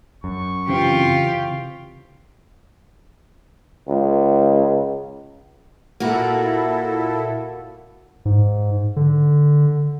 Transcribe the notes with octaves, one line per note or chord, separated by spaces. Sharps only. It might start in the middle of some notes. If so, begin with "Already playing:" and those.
F#2 C#6
C#3 E3 C4 F4 G4
C#2
A#2 A#3 E4 F#4 A4
G#2
D3